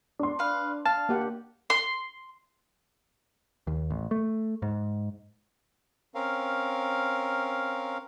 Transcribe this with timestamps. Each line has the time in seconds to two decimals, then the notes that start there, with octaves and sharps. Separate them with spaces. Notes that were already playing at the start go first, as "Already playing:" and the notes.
0.19 D4 C6
0.39 B4 F5
0.86 F5 A5
1.09 A#3 G4 F#5
1.70 C6
3.67 D#2
3.90 A1
4.11 A3
4.62 G#2
6.15 C4 C#4 A#4 F5